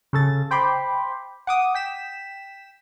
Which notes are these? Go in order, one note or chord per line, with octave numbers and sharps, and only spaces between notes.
C#3 A4 A6
C5 G5 B5 C6 D6
F#5 D6 D#6
G5 B6 E7